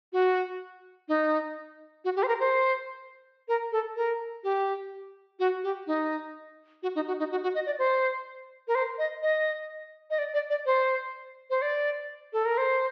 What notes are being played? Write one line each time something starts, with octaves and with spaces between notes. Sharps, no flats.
F#4
D#4
F#4
G4
C5
A#4
C5
A#4
A4
A#4
G4
F#4
G4
D#4
F#4
D#4
F#4
D#4
F#4
F#4
D#5
D5
C5
A#4
C5
D#5
D#5
D#5
D5
D5
D5
C5
C5
D5
A4
A#4
C5